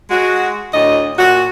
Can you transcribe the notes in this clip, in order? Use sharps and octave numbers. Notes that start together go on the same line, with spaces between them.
G#3 F#4
D2 A2 D#5
A#2 F#4